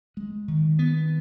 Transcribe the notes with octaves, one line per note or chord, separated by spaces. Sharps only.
G#3
D#3
B3